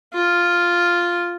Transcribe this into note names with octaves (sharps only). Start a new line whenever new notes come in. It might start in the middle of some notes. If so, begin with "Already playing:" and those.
F4